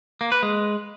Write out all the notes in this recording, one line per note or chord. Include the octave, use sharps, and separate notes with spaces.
A#3
B4
G#3